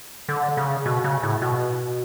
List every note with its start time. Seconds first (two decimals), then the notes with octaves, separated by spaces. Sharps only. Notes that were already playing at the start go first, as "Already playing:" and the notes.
0.29 D3
0.57 C#3
0.86 B2
1.04 C#3
1.23 A2
1.42 B2